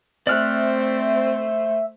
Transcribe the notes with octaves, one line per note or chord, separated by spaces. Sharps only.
A3 C4 C5 D5 E5 F6 F#6